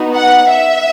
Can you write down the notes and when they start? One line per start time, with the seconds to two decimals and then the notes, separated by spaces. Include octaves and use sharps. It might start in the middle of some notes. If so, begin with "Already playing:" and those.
Already playing: B3 D#4 F#4
0.15 F#5
0.51 E5